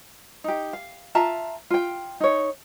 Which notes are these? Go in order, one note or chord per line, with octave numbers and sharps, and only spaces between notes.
D#4 G4
F5
F4 E5 A5 A#5
F4 G5
D#4 C#5